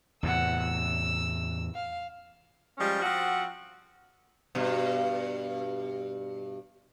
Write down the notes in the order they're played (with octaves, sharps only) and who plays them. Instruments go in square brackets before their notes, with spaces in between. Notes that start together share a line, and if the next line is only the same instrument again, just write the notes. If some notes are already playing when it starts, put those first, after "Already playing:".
[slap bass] E2 A2 C3 [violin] F#5 E6
[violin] E6
F5
[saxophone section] F3 G3 G#3 C#4
F3 C4 F#4 F#5
[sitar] G2 B2